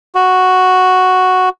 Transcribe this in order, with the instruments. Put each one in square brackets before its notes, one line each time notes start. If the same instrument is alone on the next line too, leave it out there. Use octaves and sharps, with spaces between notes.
[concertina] F#4